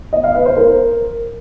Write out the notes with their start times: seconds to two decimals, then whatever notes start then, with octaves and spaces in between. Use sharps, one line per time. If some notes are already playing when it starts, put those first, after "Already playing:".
0.13 D#5
0.24 F5
0.35 B4
0.46 C5
0.57 A#4